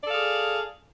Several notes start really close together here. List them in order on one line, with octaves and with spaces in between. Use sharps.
D5 A4 F5 G#4